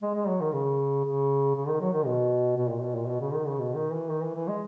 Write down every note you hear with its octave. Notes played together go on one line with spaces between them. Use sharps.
G#3
G#3
F#3
D#3
C#3
C#3
C#3
D#3
F#3
D#3
B2
B2
A#2
B2
A#2
B2
C#3
D#3
C#3
B2
D#3
E3
D#3
E3
E3
G#3